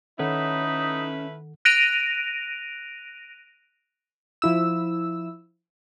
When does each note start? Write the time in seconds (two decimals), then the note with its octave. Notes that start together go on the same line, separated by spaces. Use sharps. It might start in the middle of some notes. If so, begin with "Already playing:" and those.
0.19 D#3 A3 C#4 D#4 E4 A4 B4 F#5
1.65 F#6 A#6 D7 D#7 F7
4.42 F3 E4 E6